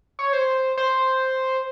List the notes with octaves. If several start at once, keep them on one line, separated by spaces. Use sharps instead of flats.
C#5
C5
C5